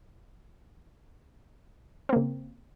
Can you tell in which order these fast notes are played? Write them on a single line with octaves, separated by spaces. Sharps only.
C4 A#3 C#3